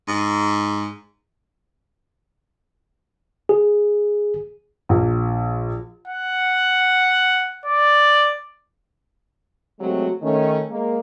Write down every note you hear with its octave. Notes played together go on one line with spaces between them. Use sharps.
G#2
G#4
A#1
F#5
D5
C3 F#3 G#3 A3 C4 F#4
D#3 A3 C#4
G#3 A#3